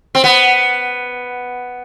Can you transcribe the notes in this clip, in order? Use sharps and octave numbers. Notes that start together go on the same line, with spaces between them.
C4
B3